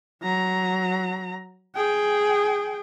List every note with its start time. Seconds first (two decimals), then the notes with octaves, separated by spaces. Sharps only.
0.22 F#3 A#5
1.75 G#4 G5